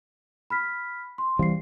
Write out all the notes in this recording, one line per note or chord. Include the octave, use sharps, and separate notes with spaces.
B5 F6 B6
C6
E3 G3 C4 F5 C7